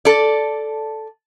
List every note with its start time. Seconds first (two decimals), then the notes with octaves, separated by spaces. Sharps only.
0.05 A4 D5